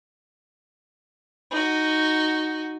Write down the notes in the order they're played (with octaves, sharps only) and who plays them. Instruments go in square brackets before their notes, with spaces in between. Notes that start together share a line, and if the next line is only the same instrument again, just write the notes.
[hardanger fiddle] D#4 F#4